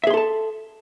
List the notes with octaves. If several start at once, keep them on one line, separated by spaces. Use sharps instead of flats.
G#4 A4 E5 A5 C6